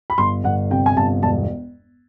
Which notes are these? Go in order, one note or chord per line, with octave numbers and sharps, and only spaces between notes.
B5
G1 C6
G1 F#5
C3 G5
G#5
G1 A5
E1 A5